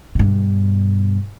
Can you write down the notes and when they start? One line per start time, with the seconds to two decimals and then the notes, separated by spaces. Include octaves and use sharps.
0.15 G2 B2